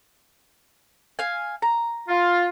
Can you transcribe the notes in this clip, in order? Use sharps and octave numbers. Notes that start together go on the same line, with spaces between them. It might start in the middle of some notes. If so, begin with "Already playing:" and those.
F5 G#5
A#5
F4